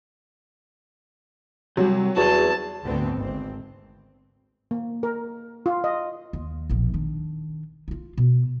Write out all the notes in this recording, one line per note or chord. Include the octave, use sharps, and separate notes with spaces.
C3 F#3 G3
E2 F#4 G#4 C5 A5
D2 G#2 D3 B3 C4
G#1 C4
A#3
A#4
F4
D#5
D#2
E1 A#1
D#3 D4
D#4 F4
B2